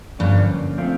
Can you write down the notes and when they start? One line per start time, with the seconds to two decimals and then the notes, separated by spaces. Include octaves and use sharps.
0.19 G2 D3 F3 A#3 C#4
0.78 F3 A3 C4 F4